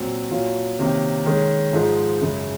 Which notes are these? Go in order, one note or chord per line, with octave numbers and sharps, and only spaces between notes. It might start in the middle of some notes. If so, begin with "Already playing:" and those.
Already playing: A#2 F#3 C4
A#2 F#3 C#4 F4
C3 D#3 A#3 C#4
D#3 G#3 C#4
G#2 F3 G#3 D#4
F#2 C#3 G#3